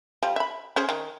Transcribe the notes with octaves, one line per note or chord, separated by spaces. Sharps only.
F3 G3
E5 B5
C#4 G#4 C5
D#3